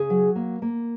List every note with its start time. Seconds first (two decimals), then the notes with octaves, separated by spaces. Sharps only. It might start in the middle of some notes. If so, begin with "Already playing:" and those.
Already playing: C#3 G#4
0.10 F#3
0.36 A#3
0.62 A#3